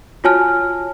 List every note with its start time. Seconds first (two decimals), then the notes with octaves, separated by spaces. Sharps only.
0.24 F4 F#4 C#5 G#5 A5 F6